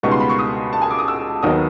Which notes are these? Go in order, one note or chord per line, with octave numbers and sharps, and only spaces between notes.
C#2 B2 G3 B3 D#4 C#6
C6
B5
C#6
D#6
A5
G#5
D6
D#6
E6
D#2 D#3 F#3 B3 D#4 D#6